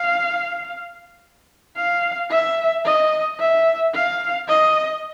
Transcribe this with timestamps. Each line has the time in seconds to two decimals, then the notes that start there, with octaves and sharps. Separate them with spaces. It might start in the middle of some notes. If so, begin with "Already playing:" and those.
Already playing: F5
1.76 F5
2.30 E5
2.85 D#5
3.39 E5
3.94 F5
4.48 D#5